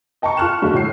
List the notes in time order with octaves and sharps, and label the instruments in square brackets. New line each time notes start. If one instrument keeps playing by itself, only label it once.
[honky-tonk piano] D#5 G5 A5 A#5 C#6
F4 C#6 F6 F#6 E7
D3 F#3 G#3 A3
A2 C7